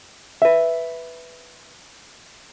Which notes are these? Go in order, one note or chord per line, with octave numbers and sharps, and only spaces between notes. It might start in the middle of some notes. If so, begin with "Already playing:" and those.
B4 E5